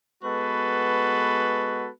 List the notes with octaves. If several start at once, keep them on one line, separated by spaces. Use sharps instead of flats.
G#3 B3 F#4 A4 B4